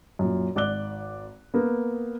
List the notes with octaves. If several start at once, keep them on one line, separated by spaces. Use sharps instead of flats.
F#2 A#2
G#1 D5 D6 F#6 G7
A#3 B3